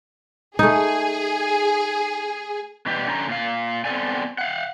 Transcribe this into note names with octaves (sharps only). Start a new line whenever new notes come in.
A3 D#4 G#4
B2 E3 G3 G4
D3 C#4 G#5 A#5
A#2 F5
B3 C4 A4 D5 G#5
F5 F#5